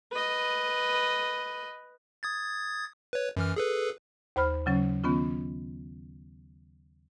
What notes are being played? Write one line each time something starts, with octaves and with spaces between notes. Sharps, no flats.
B4 D#5
D#6 G#6 A6
B4 C#5
F#2 E3 F6
G#4 A4 B4
D#2 C5 B5 F6
C#3 F#3 C#4
D#3 B3 C#4 F4